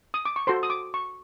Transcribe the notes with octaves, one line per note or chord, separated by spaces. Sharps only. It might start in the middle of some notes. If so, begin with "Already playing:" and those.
D#6
D6
C#6
F#4 A4 C5 C6
D#6
D6
C#6